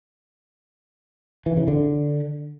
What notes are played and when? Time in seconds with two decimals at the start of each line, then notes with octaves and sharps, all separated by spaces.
1.46 E3
1.57 C#3
1.68 D3